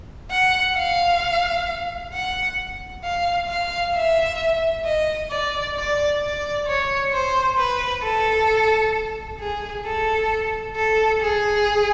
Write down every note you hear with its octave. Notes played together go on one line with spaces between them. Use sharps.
F#5
F5
F#5
F5
F5
E5
D#5
D5
D5
D5
C#5
C5
B4
A4
G#4
A4
A4
G#4